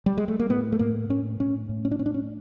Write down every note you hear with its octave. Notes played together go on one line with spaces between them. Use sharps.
G3
G#3
A3
A#3
A2 B3
A3
A2 A#3
A2 C#4
A2 C#4
A2
C#4
D4
A2 C#4
D4
C#4